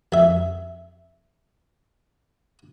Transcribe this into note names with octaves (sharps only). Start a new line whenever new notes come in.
F2 E5